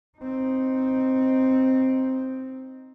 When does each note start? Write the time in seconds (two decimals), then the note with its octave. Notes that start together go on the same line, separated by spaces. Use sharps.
0.18 C4 D#4